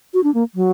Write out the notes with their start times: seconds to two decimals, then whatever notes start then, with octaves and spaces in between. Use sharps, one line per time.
0.14 F#4
0.24 D4
0.34 A#3
0.55 F#3